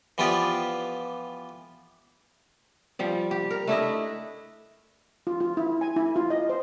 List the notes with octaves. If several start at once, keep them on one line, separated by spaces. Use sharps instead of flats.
E3 F3 B3 F4 G4 D5
F3 G3 D5
G4
A#4
A3 D4 E4 D#5
F4
F4
E4
G#5
E4
F4
D#5
C5